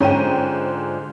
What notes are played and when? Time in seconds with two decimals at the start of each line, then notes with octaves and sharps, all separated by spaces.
0.01 G#2 D3 G#3 C#4 F4 C5 G5 D#7